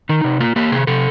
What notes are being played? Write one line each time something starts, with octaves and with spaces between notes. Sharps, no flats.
D#3 D#4
C3
A#3 F4
A#3 G4
C3 G#4
C3 A4